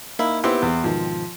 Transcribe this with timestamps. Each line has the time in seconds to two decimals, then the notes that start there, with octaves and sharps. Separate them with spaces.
0.19 A#3 D#4 E4 F5
0.44 B3 C4 E4 G4
0.62 E2
0.84 G#2 B2 D#3 F3